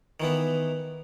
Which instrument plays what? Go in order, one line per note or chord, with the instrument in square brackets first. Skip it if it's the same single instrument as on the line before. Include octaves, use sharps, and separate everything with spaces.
[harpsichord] D#3 E3 B3